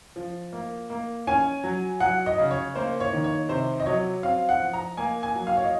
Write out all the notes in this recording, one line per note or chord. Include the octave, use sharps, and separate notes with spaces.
F3
A#3
A#3
C#4 G#5
F#3
F#3 F#5
D#5
C#3
C#5
A#3 C5
C#5
D#3
C#5
C3 C5
D#5
F#3 C#5
C4 F5
F#5
F3
A#5
A#3 G#5
G#5
F#3
F5
C#5
D#5